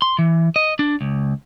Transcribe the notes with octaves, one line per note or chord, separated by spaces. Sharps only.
C6
E3
D#5
D4
C#2